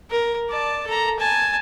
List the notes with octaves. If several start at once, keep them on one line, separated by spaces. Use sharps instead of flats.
A#4
D5 A5
A4 A#5
G#5 A5